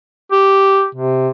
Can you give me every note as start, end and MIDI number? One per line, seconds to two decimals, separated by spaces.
0.32 0.86 67
0.95 1.29 48